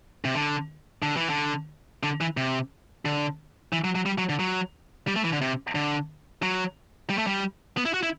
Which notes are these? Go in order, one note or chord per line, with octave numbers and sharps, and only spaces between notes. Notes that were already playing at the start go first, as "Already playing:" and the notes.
C3
D3
D3
E3
D3
D3
E3
C3
D3
E3
F#3
F#3
G3
F#3
D3
F#3
G3
A3
E3
D3
C3
D3
F#3
G3
A3
G3
B3
E4
F#4
E4